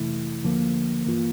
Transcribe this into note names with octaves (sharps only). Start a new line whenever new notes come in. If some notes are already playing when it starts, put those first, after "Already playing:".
Already playing: F2 C3 E3 A3 E4
D2 D3 F3 A#3
G2 E3 A#3 F4